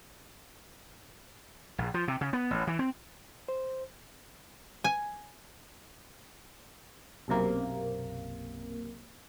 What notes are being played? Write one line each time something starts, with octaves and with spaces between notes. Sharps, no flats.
A#1
F3
C3
C#3
B3
A1
E3
C4
C5
G#5
B1 F#2 C3 A#3